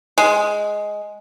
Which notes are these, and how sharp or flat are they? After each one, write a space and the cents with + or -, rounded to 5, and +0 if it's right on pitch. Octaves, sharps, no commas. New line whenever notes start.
G#3 +5